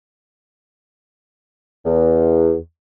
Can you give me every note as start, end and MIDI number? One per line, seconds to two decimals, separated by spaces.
1.85 2.55 40